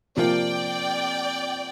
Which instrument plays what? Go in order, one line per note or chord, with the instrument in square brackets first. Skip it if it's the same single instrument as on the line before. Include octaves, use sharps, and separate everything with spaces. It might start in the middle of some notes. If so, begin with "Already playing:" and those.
[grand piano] C3 F3 A#3 F4 [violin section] D5 G5